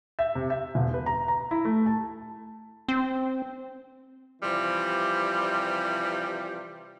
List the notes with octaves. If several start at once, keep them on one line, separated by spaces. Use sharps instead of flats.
E5
C3
E5
E1
B4
A#5
A#5
E4
A3
A5
C4
C3 E3 F3 G3